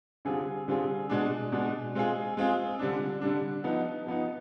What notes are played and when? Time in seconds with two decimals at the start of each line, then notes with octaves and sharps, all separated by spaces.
0.25 D3 G3 C4 F4 G#4
0.68 D3 G3 C4 F4 G#4
1.09 B2 G#3 D4
1.52 B2 G#3 D4
1.95 G#3 C4 F4 G#4
2.37 G#3 C4 F4 G#4
2.79 D3 G3 D4
3.21 D3 G3 D4
3.64 F3 B3 D#4
4.07 F3 B3 D#4